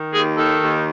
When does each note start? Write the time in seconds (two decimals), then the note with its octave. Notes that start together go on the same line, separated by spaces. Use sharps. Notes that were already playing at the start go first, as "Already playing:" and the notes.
Already playing: D#3
0.12 D#2 G#4
0.36 D#3 A4
0.60 D#2